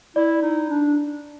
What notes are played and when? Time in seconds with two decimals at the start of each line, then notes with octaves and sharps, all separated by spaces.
0.16 E4 D5
0.42 D#4
0.70 D4